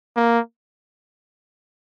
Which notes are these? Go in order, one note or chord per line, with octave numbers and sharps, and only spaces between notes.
A#3